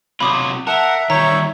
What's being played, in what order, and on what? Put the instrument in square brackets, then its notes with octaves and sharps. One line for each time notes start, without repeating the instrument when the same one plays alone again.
[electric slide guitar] C3 F#3 F4 [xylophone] B5 D6 D#6
[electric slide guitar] A#4 [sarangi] E5 [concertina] F#5 [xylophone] A5 E7
[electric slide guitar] D#3 G3 [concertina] C#5 [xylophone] A#5